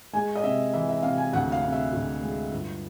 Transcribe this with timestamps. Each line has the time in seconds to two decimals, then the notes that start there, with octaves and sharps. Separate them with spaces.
0.13 G#3 G#5
0.36 D#5
0.43 C3 E5
0.73 E3 E5
0.89 E5
1.03 C3 F5
1.18 G#5
1.33 D2 F#5
1.52 F5
1.63 C3
1.72 E5
1.93 D2
2.21 G#3
2.52 G1